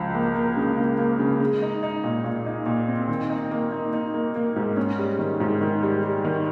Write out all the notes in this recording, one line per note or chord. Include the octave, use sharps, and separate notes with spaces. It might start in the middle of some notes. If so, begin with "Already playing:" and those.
Already playing: C#2 F3
A#3
A#3
C#3
A#3
A#3
C#3
G#3
D#4
D#4
A#2
A#2
D#4
A#2
C4
D#3
D#4
A#3
D#4
D#4
A#3
A#3
G#2
C#4
G3
D#3
G#2
D#3
G3
G3
D#3